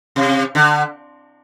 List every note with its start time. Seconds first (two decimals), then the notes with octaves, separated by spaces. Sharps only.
0.16 C3
0.55 D3